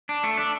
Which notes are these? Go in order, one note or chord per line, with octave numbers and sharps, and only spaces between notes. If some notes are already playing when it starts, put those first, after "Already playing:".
D4
A3
D4